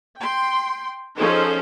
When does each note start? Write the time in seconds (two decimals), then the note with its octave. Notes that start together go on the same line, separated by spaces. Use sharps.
0.19 G5 C6
1.17 F3 C#4 D#4 G#4 A4 C5